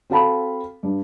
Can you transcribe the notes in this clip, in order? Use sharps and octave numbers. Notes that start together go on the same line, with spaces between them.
C4 F#4 A4 F5 A5 B5
G2